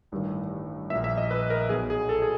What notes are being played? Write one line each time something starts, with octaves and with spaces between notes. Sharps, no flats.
A1 G2 D#3
A#1 A#2 E5
E5
D#5
B4
A#4
B1 B2 G#4
G#4
A4
G#4